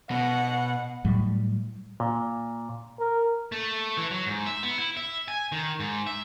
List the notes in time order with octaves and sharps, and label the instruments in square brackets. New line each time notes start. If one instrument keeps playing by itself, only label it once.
[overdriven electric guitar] B2 [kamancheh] F#5
[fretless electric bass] A2 F#3 G3
[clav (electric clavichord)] A#2
[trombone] A#4
[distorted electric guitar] A3
E3
F#3
G#2
E5
B3
E4
E5
G#5
D#3
G#2
E5